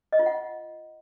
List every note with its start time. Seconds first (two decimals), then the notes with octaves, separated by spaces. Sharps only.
0.12 D#5
0.19 F4
0.26 F#5